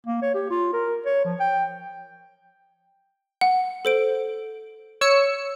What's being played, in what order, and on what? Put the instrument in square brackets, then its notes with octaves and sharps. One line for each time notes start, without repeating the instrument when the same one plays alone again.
[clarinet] A#3
C#5
G4
F4
A#4
C#5
F3
G5
[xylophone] F#5
A4 C5 D7
[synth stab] C#5 E6 C#7